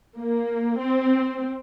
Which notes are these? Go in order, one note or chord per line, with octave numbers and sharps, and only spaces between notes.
A#3
C4